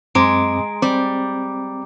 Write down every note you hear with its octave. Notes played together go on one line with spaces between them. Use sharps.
F#2 G#3 C4 A#5 D6 D7
G3 C4 D6